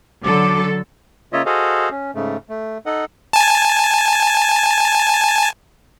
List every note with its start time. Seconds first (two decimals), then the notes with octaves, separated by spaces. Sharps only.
0.24 D3 F#3 A4 D6
1.33 C#3 A#3 F4 C#5 D#5 E5
1.46 F#4 G#4 A4 C5 D#5 F5
1.91 C#4
2.15 G#2 C#3 A3
2.49 A3
2.86 D#4 A4 D#5 F#5
3.33 G#5 A5